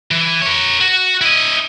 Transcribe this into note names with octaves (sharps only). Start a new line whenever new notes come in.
E3
A#4 C#5
F#4
E4 D#5